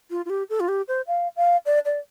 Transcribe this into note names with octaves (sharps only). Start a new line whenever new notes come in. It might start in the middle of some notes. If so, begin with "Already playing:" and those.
F4
F4
G4
A4
F4
G4
C5
F5
F5
D5
D5